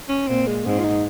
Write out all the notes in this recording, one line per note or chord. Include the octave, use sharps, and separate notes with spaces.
C#4
A#2 C4
G#3
G#2 C4
F4
D#4